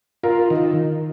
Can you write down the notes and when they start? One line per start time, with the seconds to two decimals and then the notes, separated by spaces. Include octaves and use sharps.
0.23 F4 A#4
0.50 D#3